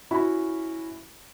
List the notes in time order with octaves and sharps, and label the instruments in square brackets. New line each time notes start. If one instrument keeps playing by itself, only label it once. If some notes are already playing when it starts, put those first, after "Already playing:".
[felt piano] C#4 E4 F#4 B5